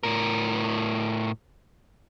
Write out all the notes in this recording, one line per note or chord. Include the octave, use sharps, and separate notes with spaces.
A2 A#4